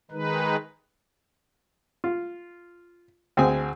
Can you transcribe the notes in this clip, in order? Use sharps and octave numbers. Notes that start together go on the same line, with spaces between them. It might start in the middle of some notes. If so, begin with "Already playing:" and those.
D#3 G#3 D#4 B4
F4
D2 C4 G#4 F#5 G#5